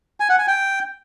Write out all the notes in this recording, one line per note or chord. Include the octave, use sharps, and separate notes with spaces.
G#5
F#5
G#5
G5